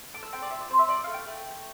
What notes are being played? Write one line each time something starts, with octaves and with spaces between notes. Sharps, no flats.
A4 D6
E6
C4 G5
D5
F4 E5
D5
C4 C5
E5
F4 D5
A3 F5
G5
A3
A3